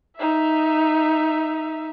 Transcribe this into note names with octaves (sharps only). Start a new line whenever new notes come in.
D#4 E5